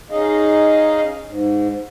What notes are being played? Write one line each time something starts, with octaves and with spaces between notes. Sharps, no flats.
C#4 D#4 G#4 D#5 F5
G#2